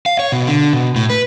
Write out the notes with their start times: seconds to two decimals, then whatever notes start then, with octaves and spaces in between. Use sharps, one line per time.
0.06 F5
0.19 C#5
0.32 B2
0.47 D3
0.73 B2
0.96 A2
1.10 B4